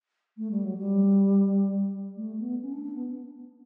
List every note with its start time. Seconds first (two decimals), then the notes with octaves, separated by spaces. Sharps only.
0.37 A3
0.51 G3
0.64 F#3
0.77 G3
2.16 A3
2.39 B3
2.61 C#4
2.72 D4
2.83 D4
2.94 B3